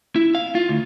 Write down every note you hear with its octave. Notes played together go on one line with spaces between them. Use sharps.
E4
F5
F4
D2